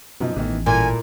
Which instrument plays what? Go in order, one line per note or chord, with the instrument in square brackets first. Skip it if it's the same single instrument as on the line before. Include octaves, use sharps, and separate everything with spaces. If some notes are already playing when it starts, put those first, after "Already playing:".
[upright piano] F#2 F3 D#4 [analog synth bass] B2
[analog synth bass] A1 [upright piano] B2 D#3 E3
[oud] A#2 [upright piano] E4 A4 A#4 [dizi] G#5